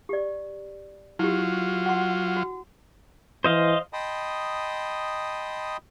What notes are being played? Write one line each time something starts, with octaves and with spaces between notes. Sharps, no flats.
G4 D5
F#3 E4 F4 G4
F#5 C6
F#4
E3 C5 D#5 F5
D#5 G5 A5 B5 C6 D#6